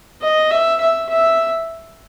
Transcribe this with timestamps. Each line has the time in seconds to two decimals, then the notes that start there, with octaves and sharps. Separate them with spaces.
0.22 D#5
0.51 E5
0.81 E5
1.09 E5